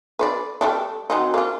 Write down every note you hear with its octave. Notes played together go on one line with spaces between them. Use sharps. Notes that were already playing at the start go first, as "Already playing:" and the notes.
B4 C5 D5
G3 A3 D4
F#3 C4 D#4
A#3 F4